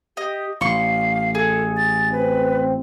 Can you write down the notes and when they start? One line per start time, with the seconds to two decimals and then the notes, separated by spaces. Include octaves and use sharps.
0.17 G4 D#5
0.61 A1 F5 C6 C#6
1.35 G#4 A4
1.77 A6
2.12 C4 B4